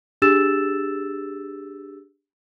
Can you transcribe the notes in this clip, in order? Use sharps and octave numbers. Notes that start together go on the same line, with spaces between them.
D4 G4 G#4 E6 A6 E7